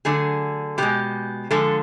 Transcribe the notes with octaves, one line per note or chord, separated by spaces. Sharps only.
D3 F#3 A3 G#4
B2 G#3 G4
D3 F3 G#3 A4